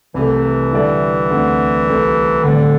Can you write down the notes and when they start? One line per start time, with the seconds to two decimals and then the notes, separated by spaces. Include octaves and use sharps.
0.14 C2 C3 E3 A3
0.72 D3 G3 E4 A4 D5
1.29 D2 D3 C4
1.87 C2 C3 A3 C4
2.44 A2 D3 G3 C4 A4 D5